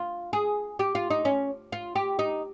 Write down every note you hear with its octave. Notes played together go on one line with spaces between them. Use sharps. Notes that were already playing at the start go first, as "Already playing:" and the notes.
Already playing: F4
G#4
G4
F4
D#4
C#4
F4
G4
D#4